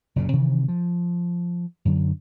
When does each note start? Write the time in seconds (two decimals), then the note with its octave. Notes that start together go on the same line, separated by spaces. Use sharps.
0.16 F#1 F#2 A#2 C#3
0.33 C3 D#3 E3
0.68 F3
1.85 F#2 D3 F#3